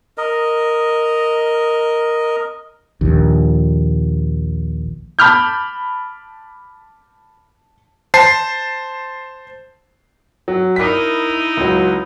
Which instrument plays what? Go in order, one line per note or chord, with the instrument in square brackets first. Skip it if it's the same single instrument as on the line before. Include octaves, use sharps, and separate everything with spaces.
[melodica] A#4 D#5
[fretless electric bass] A#1 D#2
[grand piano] A5 B5 D6 F6 G6
[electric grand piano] C5 A5 C7
[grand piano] F#3
[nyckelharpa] D#4 E4 [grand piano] A#4 B6
[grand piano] C#2 F#3